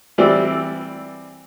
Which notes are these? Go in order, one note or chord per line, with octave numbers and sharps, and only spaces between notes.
E3 G3 C4 D5